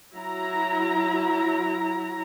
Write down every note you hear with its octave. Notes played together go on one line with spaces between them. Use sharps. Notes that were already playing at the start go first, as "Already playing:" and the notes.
F#3 E4 A#5